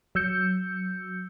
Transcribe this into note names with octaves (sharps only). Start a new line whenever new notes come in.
F#3 E6 G6 C#7